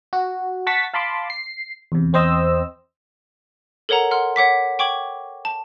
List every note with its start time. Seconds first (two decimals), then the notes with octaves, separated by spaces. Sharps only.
0.13 F#4
0.67 F#5 A5 C#6 A6 B6
0.94 F5 A5 B5 C6 D6
1.30 C7
1.92 E2 C3
2.13 E2 C4 C5 D#5 E6
3.89 A4 A#4 C#5 F#5 A#5
4.11 F#5 C6 F6
4.36 C#5 F#5 D6 B6
4.79 G5 C#6 D6 G#6 F#7
5.45 A5